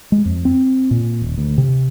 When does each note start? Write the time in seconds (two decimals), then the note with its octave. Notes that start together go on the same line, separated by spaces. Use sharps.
0.12 G#3
0.25 F2
0.45 C4
0.91 A#2
1.22 D#1
1.38 D2
1.58 C3